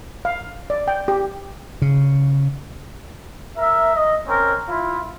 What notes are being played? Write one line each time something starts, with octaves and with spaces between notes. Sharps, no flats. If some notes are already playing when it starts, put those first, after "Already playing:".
F5
D5
G5
G4
C#3
A#4 E5
D#5
C4 C#4 A#4
E4 F4